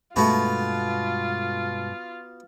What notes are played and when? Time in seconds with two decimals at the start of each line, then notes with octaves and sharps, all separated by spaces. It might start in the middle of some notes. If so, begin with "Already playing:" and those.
0.16 G2 B2 G#3 A3 B3 F4 F#4